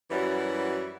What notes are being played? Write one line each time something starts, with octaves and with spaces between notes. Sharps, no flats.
F#2 E3 G3 E4 F#4 C#5